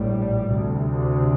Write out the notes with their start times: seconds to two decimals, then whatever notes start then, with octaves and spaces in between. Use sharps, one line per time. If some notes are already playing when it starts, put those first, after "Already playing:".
Already playing: A#1 A2 G3
0.47 D2 C3